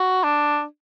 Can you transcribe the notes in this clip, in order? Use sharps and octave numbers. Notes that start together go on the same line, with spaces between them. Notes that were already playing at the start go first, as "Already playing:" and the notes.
Already playing: F#4
D4